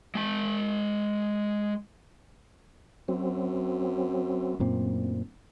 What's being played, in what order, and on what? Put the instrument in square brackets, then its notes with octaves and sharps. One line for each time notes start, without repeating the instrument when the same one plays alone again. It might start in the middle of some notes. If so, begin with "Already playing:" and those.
[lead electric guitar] G#3 A5
[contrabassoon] F#2 [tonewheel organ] F#3 C4
[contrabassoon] D1 [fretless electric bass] F#2 A#2 C4